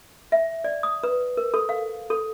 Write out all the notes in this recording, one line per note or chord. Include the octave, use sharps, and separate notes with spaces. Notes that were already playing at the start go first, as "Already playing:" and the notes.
E5
D5
D#6
B4
A#4
A4
F5
A4